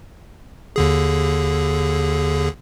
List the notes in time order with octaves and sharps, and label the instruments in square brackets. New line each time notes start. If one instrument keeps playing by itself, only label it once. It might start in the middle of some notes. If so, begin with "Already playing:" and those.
[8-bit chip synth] D#2 D3 G#4